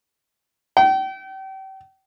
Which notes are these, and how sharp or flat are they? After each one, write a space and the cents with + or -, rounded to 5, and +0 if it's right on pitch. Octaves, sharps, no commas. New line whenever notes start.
G5 -35